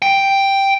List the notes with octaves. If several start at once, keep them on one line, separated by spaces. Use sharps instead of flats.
G5